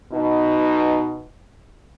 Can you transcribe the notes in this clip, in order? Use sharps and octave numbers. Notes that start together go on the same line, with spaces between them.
B2 D#4